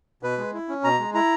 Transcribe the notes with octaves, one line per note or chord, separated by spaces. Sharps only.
B2 B4
G#3
E4
C#4
B2 A#5
G#3
E4 A#5